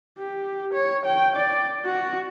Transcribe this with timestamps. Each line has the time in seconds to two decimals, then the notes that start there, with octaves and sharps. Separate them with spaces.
0.18 G4
0.73 C#5
1.06 G5
1.36 D5
1.85 F#4